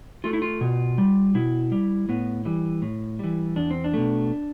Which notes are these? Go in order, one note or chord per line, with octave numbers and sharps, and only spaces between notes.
A3 F4
E4
F4
B2
G3
B2 E4
G3
A2 B3
E3 G3
A2
E3 G3
E2 D4
C4
D4
B2 A3